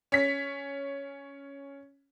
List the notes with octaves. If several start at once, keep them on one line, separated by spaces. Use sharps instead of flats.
C#4 B6